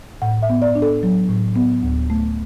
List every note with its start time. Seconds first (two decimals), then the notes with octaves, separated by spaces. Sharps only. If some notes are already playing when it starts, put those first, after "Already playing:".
0.22 A2 F#5
0.42 E5
0.49 B3
0.62 D5
0.75 D4
0.82 A4
1.03 F#3
1.29 A2
1.56 B3
1.83 D2
2.10 A3